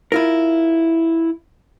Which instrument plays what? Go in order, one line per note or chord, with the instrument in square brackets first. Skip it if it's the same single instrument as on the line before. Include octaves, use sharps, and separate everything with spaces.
[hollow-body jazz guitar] E4 F4 A#4